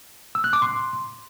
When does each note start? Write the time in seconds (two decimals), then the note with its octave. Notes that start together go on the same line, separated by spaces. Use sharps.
0.35 E6
0.44 F#6
0.53 D6
0.62 C6